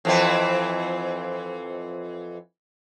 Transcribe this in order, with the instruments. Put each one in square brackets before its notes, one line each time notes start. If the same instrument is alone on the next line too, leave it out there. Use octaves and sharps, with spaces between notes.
[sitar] F2 E3 C4